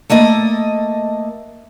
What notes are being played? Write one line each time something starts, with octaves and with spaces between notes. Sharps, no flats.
A3 A#3 A4 D#5